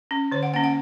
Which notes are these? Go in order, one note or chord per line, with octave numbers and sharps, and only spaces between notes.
C#4
D3 C#5
F#5
A#3 C#4 F#5
F#5